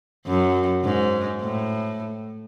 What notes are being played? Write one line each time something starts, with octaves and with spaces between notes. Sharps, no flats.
F#2
G#2
A2